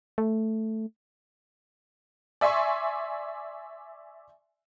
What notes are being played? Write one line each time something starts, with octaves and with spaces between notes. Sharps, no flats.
A3
D5 E5 G#5 C6 C#6